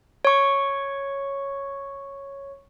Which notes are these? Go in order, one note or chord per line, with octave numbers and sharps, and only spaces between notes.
C#5 C#6